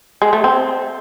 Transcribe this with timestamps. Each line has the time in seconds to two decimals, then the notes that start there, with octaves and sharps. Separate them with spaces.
0.22 G#3
0.33 A3
0.44 C4